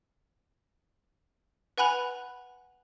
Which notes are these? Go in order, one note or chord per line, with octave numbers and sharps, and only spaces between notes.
B4 F#5 G#5 B5 F#6 F7